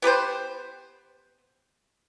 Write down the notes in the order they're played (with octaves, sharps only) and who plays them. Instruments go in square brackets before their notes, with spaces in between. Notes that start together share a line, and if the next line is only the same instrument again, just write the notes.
[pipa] B3 G4 B4 C5